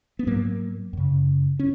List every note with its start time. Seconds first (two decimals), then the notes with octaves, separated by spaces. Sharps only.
0.19 B3
0.27 G#2 F#3 A#3
0.93 F#2 C#3
1.59 C#4